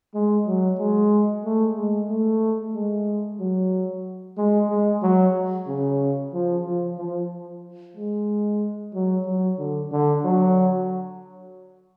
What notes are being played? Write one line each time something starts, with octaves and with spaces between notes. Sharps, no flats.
G#3
F#3
G#3
A3
G#3
A3
G#3
F#3
G#3
G#3
F#3
C#3
F3
F3
F3
G#3
F#3
F#3
D3
D3
F#3